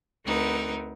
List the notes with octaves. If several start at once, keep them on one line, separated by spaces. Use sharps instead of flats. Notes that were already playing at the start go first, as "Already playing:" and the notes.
D2 B3 C4 D#4 A#4